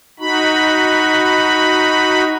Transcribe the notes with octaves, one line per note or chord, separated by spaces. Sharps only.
D#4 F#4 B5